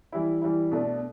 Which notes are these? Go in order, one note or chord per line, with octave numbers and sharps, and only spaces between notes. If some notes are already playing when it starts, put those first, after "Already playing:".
E3 G3 E4
E3 G3 E4
B2 A3 D4